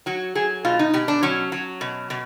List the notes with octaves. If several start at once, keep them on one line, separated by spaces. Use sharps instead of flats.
F#3 F#4
F#3 G#4
B2 F4
D#4
B2 G4
D4
F#3 C#4
F#3
B2
B2